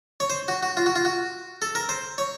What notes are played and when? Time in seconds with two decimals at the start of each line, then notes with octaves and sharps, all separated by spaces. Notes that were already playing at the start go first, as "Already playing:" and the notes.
0.20 C#5
0.30 C5
0.48 F#4
0.63 F#4
0.77 F4
0.86 F#4
0.96 F4
1.05 F#4
1.62 A4
1.75 A#4
1.89 C5
2.18 C#5